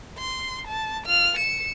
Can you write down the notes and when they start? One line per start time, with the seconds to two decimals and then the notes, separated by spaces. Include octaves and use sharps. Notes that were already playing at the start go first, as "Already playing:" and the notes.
0.18 C6
0.67 A5
1.05 F4 F6
1.37 C#7 E7